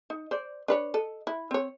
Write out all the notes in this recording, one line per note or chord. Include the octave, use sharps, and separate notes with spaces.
D#4
C5 D5
D4 B4 C#5
A4 D#5
E4
C4 C#5